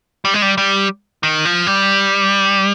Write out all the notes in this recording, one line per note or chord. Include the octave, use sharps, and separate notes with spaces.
G3
G#3
G3
G3
D#3
F3
G3